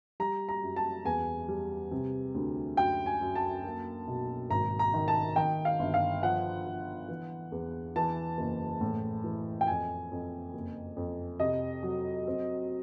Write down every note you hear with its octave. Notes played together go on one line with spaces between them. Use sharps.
G3 A#5
A#5
F#2
A5
E2 G#5
G3
C3
D2
F#2 G5
G#5
F#2
A5
A#3
B1
G#1 A#5
A#5
D#3
A5
D#3 G5
F5
G1
F5
F3 F#5
F3
E3
E2
E3 A5
F#1
A2
E3
G5
F2 G#5
F2
F#1
F2
C3 D#5
F#3
C4